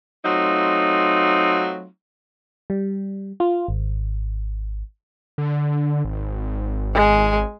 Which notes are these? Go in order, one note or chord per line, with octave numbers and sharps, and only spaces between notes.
F#3 A3 C4 D#4 F4
G3
F4
G#1
D3
G#1
G#3 G#5